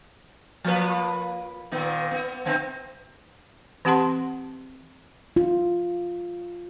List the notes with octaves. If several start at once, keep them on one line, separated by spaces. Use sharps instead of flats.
F3 A#3 B4
A#2 D#3 B3
B3
D3 B3 C4
E3 C4 G4 F#5 A5 C6
F4